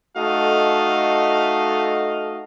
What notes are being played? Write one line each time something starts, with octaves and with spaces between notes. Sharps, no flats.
A3 D#4 F#4 A4 D#5 F5